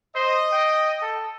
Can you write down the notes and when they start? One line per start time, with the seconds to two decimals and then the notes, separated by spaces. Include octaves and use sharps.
0.15 C5 D#5
0.52 G5
1.02 A4